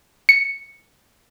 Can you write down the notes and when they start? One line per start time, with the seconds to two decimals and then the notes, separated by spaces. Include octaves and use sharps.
0.29 C#7